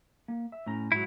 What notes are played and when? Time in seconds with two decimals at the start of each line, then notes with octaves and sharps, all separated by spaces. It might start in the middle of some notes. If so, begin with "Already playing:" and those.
0.28 A#3
0.52 E5
0.66 A2 C#4 A#5
0.92 G#2 F#3 E4 F#4